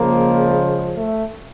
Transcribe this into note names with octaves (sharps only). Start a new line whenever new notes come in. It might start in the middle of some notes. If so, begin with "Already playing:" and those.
Already playing: C#3 F3 G#3 A#3
A3